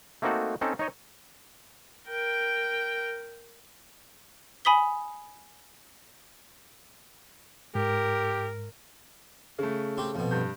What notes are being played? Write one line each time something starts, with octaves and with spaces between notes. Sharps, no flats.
A3 A#3 C4 D#4 F#4 A4
C4 C#4 D#4 A4
D#4 C#5 D#5
A#4 G5
G#5 B5 D#6 B6 G7
G#2 G4 A#4
C#3 A3
C4 G4
F2 B2
G2 G6